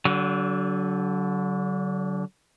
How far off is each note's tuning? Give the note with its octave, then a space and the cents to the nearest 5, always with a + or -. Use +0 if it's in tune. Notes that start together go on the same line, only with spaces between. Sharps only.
D3 -20 F#3 +30